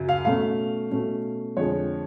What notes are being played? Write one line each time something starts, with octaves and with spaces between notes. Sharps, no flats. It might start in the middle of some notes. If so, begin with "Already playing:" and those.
Already playing: F#2 C#3 F#3
F5
B2 A3 C#4 F5
B2 A3 C#4
F2 D3 G#3 C#5